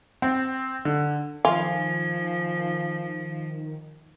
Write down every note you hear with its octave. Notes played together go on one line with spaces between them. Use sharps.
C4
D3
D#3 F3 F4 G#5